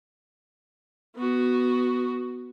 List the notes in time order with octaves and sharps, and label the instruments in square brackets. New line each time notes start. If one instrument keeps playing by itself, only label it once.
[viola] B3 F#4